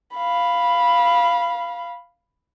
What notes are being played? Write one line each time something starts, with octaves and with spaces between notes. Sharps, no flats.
F5 B5